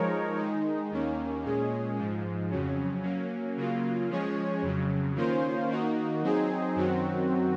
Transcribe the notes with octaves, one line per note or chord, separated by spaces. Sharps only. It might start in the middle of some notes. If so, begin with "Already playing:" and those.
Already playing: F3 G#3 D#4 A#4 C#5
D#3 G#3 D#4
D#2 D#3 A#3 C#4
A#2 G#3 C#4 G#4
G#2 F3 G#3
F2 C#3 F#3 C#4
F#3 A#3 C#4
C#3 F#3 A#3 F4
F3 G#3 C#4 G#4 C#5
F2 C#3 F#3
D#3 A#3 C#4 F4 C5
D#3 A#3 D#4 F#4
F#3 C4 D#4 G#4
F#2 D#3 F#3 C4 F#4